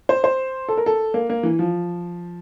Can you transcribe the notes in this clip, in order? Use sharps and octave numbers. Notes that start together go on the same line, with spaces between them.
C5
C5
A4
A#4
A4
A#3
A#3
E3
F3